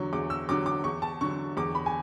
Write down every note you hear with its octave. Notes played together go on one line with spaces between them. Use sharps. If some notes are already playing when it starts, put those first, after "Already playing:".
Already playing: E2 D3 F#3 C#6
E2 D6
E6
D3 F#3 D6
D6
E2 C#6
A5
D3 F#3 C#6
E2 D6
B5
G#5